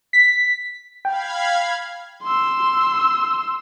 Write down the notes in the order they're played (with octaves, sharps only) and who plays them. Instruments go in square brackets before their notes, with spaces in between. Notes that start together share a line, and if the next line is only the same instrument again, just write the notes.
[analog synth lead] B6
[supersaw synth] F5 B5 G#6 [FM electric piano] G5
[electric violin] C6 E6